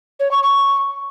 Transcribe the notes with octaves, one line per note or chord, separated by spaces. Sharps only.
C#5
C#6
C#6